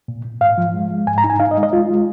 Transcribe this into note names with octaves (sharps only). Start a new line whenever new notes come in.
A#2
A#2
G#2 F5
F3
G#3
G#3
G#2 G#5
A#5
D#4
G#5
D#4 F5
D#5
G#3
D#5
G#3 F4
G#3